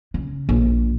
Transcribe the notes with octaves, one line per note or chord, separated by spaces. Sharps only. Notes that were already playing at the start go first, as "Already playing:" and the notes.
C#3
A#1